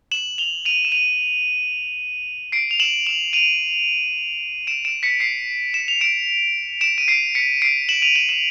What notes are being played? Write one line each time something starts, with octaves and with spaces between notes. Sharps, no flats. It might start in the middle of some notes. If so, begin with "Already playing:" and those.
E7 F#7
F7 G7
D#7 F7
E7
D#7 F7
C7 D7
F7
E7 F#7
E7 F#7
D#7 F7
D7 E7
D7 E7
B6 C#7
C7 D7
E7
F7
D7 E7
D7 E7
D#7
C7 D7
B6 C#7
C7 D7
E7 F#7
D#7 F7
E7 F#7
E7 F#7